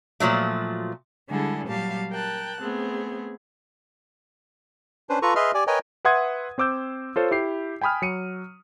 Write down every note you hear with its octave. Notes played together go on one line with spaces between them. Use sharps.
A#2 F3 F#3 A3
D3 G3 G#3 E4 G#4 A4
A#2 F#3 G3 G4 F5 A5
A#4 G5 A5 F#6
A3 B3 C4 G#4
C#4 D4 B4 C5
F4 A4 B4 A#5 C#6
G#4 B4 D#5 E5 C6 F6
G4 D5 G#5
A#4 B4 C#5 D#5 G5 G#5
B4 E5 F#5 C6 D#6 G#6
C4 C5 D6 E6 G6
F4 A4 C5 C#5 F5
E4 G4 C7
G5 G#5 B5 D#6 F6
F#3 C#7 D#7